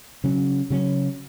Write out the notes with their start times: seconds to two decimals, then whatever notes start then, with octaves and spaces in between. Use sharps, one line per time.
0.24 C#3 F#3 C#4
0.70 C#3 F#3 C#4